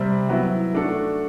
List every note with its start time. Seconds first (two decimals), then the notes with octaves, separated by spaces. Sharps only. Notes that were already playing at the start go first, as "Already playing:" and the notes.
Already playing: C3 G3 C4
0.29 F#3 B3 E4
0.74 A3 D4 F#4 A4